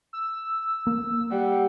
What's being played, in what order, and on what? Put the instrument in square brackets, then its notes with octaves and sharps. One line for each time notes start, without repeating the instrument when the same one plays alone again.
[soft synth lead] E6
[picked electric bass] A#3
[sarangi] G3 [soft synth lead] F#5